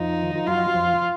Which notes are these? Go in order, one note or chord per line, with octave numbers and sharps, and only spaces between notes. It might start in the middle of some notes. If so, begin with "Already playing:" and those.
Already playing: F2 F3 D#4
D#3
F3
F#2 F#3 F4
F2 F3